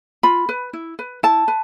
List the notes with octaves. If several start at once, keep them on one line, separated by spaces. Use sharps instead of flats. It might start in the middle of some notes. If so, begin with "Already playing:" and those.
F4 B5
B4
E4
B4
E4 A5
B4